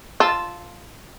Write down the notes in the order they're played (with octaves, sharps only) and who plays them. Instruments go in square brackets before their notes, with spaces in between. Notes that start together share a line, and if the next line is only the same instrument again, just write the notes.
[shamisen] F4 [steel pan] A5 E6